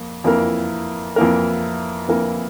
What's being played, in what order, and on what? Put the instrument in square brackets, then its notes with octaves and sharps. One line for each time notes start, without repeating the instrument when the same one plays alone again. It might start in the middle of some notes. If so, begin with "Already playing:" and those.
Already playing: [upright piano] F2 A#3
F2 E3 A#3 E4 A#4
F2 E3 A#3 E4 A#4
F2 E3 A#3 E4 A#4